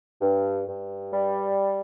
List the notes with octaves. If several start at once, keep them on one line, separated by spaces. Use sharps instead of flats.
G2
G2
G3